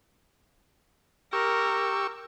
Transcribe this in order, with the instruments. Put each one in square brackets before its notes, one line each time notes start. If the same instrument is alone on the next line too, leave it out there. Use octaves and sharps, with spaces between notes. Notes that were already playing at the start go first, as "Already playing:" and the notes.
[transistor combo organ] G4 C#6 E6 [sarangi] A#4